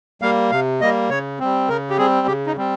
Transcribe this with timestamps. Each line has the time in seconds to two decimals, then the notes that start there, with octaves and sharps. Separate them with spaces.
0.22 G3 A#3 F5
0.51 C3 F5
0.81 G3 A#3 D#5
1.10 C#3 C#5
1.40 G3 C4
1.69 C#3 A#4
1.90 G4
1.98 G3 C4 G#4
2.27 C#3 G4
2.47 D#4
2.57 G3 C4